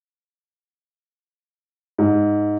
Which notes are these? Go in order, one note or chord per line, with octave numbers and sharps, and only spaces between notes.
G#2